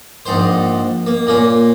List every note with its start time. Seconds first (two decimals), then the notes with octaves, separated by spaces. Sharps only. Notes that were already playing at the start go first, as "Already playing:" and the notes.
0.26 A#1 G#2 C5
1.06 A#3
1.27 A#2 A#3 C#4